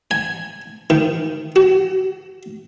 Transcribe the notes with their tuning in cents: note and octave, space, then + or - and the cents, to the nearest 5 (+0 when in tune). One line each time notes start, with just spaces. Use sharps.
G#5 +0
D#3 +5
F#4 +35